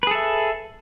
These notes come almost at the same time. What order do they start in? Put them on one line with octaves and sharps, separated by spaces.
B4 G#4 A4 E5